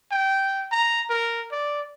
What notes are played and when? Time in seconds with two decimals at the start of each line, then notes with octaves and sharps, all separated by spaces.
0.12 G5
0.72 A#5
1.10 A#4
1.52 D5